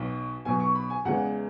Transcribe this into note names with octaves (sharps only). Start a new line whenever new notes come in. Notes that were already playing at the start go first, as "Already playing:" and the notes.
Already playing: B1 B2 F#3
B1 B2 F#3 G#5
C#6
B5
G#5
E2 C#3 E3 G#3 F#5